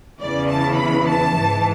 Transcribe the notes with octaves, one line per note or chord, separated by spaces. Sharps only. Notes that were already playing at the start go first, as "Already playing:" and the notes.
E2 C#3 E3 D5
A5
B5
A5
G#2 E3